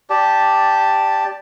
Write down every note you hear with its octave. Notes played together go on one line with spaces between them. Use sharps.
G4 D5 A5